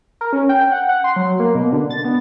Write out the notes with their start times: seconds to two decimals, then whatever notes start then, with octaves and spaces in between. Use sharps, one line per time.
0.21 A#4
0.33 C#4
0.49 G5
0.72 F#5
0.89 F#5
1.04 C6
1.16 F#3
1.39 A#3
1.55 B2
1.72 D3
1.90 A6
2.05 B3